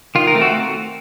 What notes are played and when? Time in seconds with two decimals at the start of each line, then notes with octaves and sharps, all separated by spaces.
0.15 D#3 F4
0.27 A#4
0.34 A3 C4
0.42 F#4